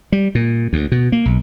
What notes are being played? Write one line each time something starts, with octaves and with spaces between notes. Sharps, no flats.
G3
A#2
D2
B2
A#3
B1